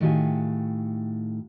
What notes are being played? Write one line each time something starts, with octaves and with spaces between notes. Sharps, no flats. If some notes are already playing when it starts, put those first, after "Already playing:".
A2 D#3 F#4 G4 F5 G#5